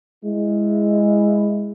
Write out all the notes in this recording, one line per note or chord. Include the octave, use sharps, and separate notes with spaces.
G#3 E4